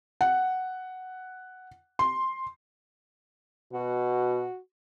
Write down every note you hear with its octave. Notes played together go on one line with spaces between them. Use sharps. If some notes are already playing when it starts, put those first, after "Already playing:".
F#5
C6
B2 F#4